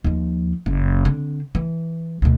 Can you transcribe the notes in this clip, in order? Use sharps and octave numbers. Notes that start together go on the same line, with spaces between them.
D#2 F3
F#1
D3 C4
E3
D2 B2